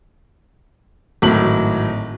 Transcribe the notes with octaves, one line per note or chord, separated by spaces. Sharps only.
G#1 A2 F#3 F#7